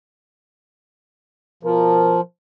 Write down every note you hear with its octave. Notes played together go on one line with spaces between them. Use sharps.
B2 F3 A#4